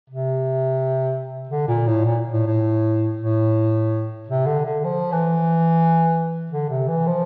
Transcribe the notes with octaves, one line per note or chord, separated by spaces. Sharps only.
C3
D3
A#2
A2
A#2
A2
A2
A2
C3
D3
D3
F3
E3
D3
C3
E3
F3